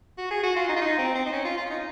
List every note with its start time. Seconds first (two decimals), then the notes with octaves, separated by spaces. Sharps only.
0.18 F#4
0.31 G#4
0.43 F#4
0.56 F4
0.69 D#4
0.76 F4
0.82 D#4
0.99 C4
1.15 C4
1.26 D#4
1.33 C#4
1.45 F4
1.57 F4
1.65 C#4
1.70 D#4